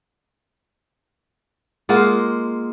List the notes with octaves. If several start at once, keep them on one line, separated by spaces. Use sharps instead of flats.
G#3 A#3 F4 F#5